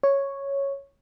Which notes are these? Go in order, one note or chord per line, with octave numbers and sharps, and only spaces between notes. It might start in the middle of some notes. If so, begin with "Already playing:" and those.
C#5